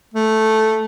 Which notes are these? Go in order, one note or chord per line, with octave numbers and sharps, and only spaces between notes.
A3